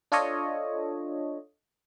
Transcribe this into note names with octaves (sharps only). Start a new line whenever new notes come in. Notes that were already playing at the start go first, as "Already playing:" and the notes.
D4 F4 A4 C#5 D#5